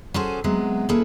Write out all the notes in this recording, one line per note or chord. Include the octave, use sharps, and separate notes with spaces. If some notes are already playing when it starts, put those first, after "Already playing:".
C#4 F#4 G#4 A4 C5
C3 F#3 G#3 B3
A#3 C#4 E4 G#4 A4 B4